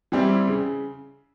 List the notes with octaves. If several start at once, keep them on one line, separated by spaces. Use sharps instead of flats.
E3 G3 C4 E4
C#3